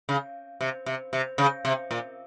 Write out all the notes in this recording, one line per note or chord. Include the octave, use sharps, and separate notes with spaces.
C#3
C3
C3
C3
C#3
C3
A#2